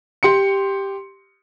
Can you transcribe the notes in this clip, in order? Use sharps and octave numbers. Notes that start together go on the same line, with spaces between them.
G4 C6 C#7